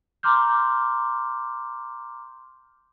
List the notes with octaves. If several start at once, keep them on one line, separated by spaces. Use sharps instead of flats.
A#5 C6 D6 F6 G6